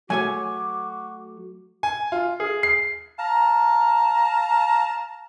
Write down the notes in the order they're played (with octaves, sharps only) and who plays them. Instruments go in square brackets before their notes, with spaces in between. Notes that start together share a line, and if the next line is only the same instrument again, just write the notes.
[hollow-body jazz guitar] F#3 A3 C#5 [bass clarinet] F#4 [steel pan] G#5 [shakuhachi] D6
[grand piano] G#5
F4
G#4
C7
[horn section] F5 A5 A#5